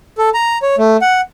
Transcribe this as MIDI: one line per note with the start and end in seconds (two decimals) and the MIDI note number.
0.18 0.29 69
0.34 0.58 82
0.62 0.76 73
0.78 0.97 57
1.01 1.21 78